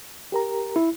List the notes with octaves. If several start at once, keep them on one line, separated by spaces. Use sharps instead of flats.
G4 A#4 A#5
E4